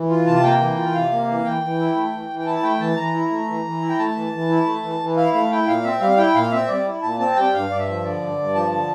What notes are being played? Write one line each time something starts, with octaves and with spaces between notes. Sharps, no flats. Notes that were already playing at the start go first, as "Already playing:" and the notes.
Already playing: E3
F4
C3 A5
A#3 G5
E3
F4
C3 F5
A#3
E3
E3 G5
E3
E4
A3
E3
E3
G5
E4 A5
A3 G5
E3 A5
E3 A#5
E4
A3
E3
E3
E4
G5
A3 A5
E3
E3
E4
A3
E3
E3
E4 F5
A3 F5
E4 G5
A#2 F5
C4 E5
G3 F5
E4 G5
A#2 F5
C4 E5
G3 D5
E4
A#2 A5
C4 A5
G3 G5
G2 F5
G2 D5
E5
F3
D3 D5
G2
G2
F3 A5
D3